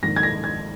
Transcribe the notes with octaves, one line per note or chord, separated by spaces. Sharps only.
A#1 G#2 D#3 A#6
G#6
A#6
G#6